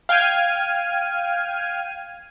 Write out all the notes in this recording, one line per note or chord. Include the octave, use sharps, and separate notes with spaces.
F5 G5 F6 G#6 D#7